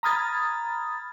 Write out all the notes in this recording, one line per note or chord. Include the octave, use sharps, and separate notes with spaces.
A#5 B5 D#6 F6 G#6 A6